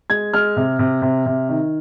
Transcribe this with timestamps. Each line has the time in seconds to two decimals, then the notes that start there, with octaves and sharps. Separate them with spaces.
0.10 G#3 G#6
0.34 G#3 F6
0.56 C3
0.79 C3
1.02 C3
1.26 C3
1.49 D#3